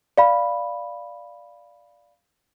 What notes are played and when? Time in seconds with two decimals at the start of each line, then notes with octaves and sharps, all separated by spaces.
0.18 D5 F5 B5